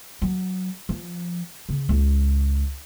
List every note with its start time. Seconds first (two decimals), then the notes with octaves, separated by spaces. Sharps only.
0.22 F#3
0.89 F3
1.69 C#3
1.89 C#2